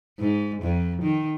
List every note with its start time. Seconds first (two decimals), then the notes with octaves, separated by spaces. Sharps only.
0.19 G#2
0.63 F2
1.03 D#3